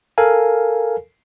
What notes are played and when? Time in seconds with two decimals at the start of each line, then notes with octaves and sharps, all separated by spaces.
0.18 A4 A#4 F5 G#5